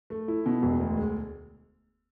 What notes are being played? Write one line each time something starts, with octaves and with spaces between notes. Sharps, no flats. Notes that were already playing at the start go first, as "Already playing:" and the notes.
A3
E4
B2
E1
D2
G#3